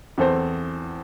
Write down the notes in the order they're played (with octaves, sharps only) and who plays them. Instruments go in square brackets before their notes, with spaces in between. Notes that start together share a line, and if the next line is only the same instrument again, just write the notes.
[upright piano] E2 E3 C4 A4 C5